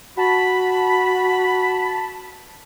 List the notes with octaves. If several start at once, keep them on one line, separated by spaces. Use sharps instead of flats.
F#4 A5 B5